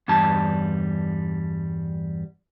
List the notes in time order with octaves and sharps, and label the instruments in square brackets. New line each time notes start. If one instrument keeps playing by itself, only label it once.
[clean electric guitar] E2 G2 G3 A5